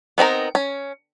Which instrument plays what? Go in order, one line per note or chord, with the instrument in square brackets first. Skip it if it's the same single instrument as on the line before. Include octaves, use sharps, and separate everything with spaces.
[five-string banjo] B3 C4 D#4 A#4
C#4